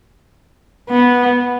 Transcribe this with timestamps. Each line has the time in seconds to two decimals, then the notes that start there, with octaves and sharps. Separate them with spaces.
0.90 B3